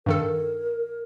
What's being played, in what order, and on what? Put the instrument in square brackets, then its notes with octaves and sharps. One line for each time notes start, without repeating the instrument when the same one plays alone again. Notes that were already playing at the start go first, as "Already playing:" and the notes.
[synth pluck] G2 D#3 A4 [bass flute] A#4